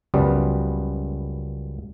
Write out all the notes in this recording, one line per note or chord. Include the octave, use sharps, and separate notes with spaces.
C#2 F#2 G3 B3